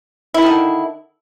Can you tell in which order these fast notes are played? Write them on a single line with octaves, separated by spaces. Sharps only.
E4 B2 D#3 D3